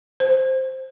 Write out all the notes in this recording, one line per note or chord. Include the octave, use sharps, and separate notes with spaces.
C5